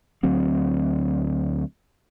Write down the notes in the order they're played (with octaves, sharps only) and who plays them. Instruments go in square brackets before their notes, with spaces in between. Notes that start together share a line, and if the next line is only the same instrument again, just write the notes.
[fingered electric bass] D2 F#3 C4